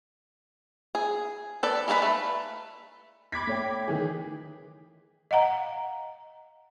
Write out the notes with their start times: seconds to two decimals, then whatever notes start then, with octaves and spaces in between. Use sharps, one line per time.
0.95 G#4
1.63 A4 B4 D5
1.88 G#3 A#3 A4 B4 B5
2.02 A3
3.32 B5 D6 G#6 B6
3.47 A3 C#5 G5
3.88 D#3 E3 G#4
5.31 D#5 F5 F#5 A#5